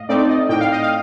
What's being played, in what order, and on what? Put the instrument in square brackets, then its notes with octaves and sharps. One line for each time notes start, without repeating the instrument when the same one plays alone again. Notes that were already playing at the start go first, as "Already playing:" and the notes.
Already playing: [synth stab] A2 D#5 F5
A3 C4 D#4 D5
D#5
A2 G5
F5
D#5
F5